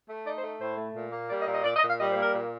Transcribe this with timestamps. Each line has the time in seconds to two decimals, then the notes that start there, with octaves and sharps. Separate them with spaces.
0.08 A3
0.25 D#4 D5
0.37 C5
0.42 A3
0.59 A2 C5
0.77 A3
0.94 A#2
1.12 A#3
1.29 G3 D5
1.41 D#5
1.47 A#2
1.53 D#5
1.64 A#2 D5
1.76 D#5
1.82 A#2
1.87 F5
1.99 G3 D#5
2.10 C5
2.16 A#3
2.22 A#4
2.34 A#2